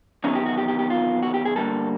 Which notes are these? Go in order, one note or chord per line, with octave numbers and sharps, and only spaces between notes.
E2 C3 D#3 F#3 B3 C#4
G4
F#4
G4
G4
G4
F4
F#4
G4
G#4
G2 D3 G3 A#3 A4